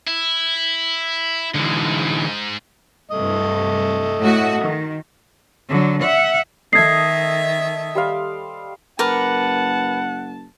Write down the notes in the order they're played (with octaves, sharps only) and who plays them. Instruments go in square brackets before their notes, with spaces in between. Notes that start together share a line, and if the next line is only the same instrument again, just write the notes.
[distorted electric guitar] E4
[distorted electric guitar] G#2 G#3 [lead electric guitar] D3 E3
[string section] C2 G2 [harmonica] A3 D#5
[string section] A2 F#4
D#3
[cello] D3 F#3
E5 F#5
[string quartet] D#3 E5 [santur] A4 D#5 [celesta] G#6 C7
[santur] G3 C5 F5
[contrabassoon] F#1 [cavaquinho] A#4 B4 D6 [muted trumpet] F#5 [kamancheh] A5